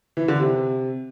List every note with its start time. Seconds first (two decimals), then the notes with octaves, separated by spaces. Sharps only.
0.17 E3
0.28 D3
0.40 C3